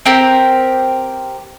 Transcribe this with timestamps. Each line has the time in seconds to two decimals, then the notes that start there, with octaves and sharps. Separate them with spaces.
0.06 C4 G4 A#4